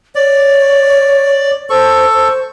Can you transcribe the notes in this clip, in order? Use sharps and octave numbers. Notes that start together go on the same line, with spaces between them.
C#5 D5
A4 C5 C#6
C5